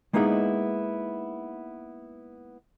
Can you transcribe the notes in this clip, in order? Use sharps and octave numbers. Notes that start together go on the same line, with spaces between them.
G#3 A#3 B3 D#4 E4 G#4